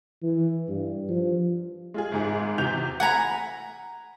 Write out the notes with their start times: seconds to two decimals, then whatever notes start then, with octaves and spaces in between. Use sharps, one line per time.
0.23 E3
0.69 G2
1.09 F3
1.94 G#3 F4 G#4
2.12 G#1 G#2 G#4
2.58 E2 C3 F#4 G6 F7
3.00 F#5 G#5 A#5 B5